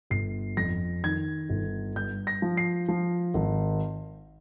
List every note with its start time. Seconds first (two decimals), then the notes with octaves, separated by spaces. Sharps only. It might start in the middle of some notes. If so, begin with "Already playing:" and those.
0.10 G1 C7
0.57 F2 A#6
1.04 D#3 G#6
1.49 G1
1.96 G2 G6
2.27 A#6
2.42 F3
2.57 C7
2.89 F3
3.34 G#1